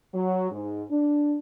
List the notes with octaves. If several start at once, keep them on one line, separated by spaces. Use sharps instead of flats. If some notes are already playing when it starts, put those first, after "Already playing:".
F#3
G#2
D4